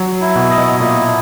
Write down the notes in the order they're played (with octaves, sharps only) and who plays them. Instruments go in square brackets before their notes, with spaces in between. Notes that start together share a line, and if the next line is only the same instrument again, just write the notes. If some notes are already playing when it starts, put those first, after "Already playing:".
Already playing: [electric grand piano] F#3
[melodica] E4
[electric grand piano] B2
[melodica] D#5
[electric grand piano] B2
[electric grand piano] A#2 [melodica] E4